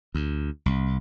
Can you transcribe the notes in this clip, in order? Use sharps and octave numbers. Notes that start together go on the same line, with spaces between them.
D2
C2